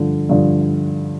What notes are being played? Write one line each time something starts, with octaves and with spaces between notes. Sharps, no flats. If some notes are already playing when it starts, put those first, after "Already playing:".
Already playing: G2 D3 F3
G2 D3 F3